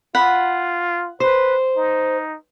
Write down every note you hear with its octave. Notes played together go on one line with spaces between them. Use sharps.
F4 F#5 B5
B4 C5
D#4